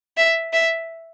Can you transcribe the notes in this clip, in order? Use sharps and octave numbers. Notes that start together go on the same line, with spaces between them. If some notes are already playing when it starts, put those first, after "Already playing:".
E5
E5